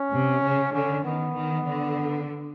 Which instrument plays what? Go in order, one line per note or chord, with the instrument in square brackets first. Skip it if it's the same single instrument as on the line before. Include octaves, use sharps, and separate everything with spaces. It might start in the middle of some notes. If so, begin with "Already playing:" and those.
Already playing: [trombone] C#4
[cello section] C3
C#3
[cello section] D3 [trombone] C#4
[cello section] D#3 [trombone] B3
[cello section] D#3
D3